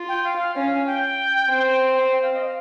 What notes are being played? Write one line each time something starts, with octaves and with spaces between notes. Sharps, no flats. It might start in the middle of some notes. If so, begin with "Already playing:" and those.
Already playing: F4
G5
F5
C#4 F5
G5
C4
G5
F5
D#5
F5